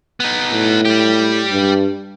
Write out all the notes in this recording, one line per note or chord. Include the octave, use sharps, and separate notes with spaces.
B3 D#4
A2
G3 G4
G2